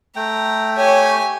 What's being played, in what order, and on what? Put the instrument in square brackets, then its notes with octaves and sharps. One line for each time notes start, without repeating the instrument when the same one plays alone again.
[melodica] A3 G5 [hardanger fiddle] A#5
[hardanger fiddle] G4 G#5 [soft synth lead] C#5